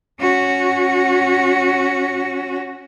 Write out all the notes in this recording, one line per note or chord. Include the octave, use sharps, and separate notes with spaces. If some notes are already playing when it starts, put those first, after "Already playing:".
C#4 F#4